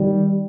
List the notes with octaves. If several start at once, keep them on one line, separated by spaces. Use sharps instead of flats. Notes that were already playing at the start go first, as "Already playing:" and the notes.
Already playing: D#3 G3